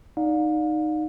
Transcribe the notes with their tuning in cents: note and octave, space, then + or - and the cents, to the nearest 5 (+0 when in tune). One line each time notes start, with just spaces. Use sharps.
D#4 -10 D5 +0 F5 +35